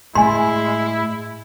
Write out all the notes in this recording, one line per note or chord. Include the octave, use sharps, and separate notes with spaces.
A2 G#3 E4 G#5 C6